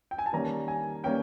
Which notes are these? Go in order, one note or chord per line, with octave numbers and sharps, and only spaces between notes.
G5
G#5
A5
D#3 G3 A#3 C#4 A#5
G#5
G3 A#3 C#4 G5